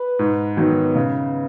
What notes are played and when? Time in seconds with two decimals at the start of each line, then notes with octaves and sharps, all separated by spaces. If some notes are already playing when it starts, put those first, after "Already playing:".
Already playing: B4
0.19 G#2
0.57 D#3 F#3 B3
0.95 C#3